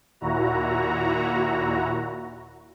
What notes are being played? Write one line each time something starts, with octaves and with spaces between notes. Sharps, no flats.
D#2 A#2 E4 F#4 A#5